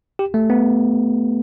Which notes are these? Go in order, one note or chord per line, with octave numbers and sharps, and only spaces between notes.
G4
A3
B3